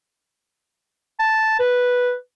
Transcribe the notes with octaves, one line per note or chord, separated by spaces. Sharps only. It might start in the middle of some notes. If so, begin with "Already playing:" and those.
A5
B4